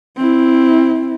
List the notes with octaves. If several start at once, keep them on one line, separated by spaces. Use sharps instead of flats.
C4 E4